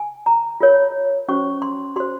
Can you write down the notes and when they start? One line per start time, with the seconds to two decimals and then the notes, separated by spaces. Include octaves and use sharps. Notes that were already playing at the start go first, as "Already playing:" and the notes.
Already playing: G#5
0.26 A#5
0.61 F4 A#4 C#5
1.28 C#4 F#4 C5 C#6
1.62 C6
1.96 F#4 C5 C6